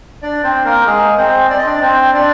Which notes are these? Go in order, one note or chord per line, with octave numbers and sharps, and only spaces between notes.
D4 D5
C4 C5
A#3 A#4
G#3 G#4
C4 C5
D5
D#5
D4 D5
C4 C5
D4 D5